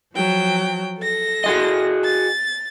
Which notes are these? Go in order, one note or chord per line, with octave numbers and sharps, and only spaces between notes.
F3 F#3 G5
A4 A#6
F#4 G#4 D#5
A6